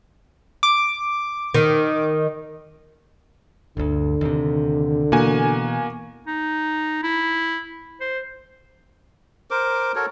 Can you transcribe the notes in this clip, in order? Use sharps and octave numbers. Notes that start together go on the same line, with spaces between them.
D6
D#3
G1 D2 D3
D#2 C3
B2 E3 A#3 F#4 G#5
D#4
E4
C5
A#4 C5 D6
F#4 A4 A#4 C#5